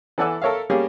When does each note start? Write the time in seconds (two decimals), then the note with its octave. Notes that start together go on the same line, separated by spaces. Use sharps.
0.18 E3 A4 D5 F#5 G#5 E6
0.42 A4 A#4 C#5 E5 F5
0.70 G3 A#3 C#4 G4 G#4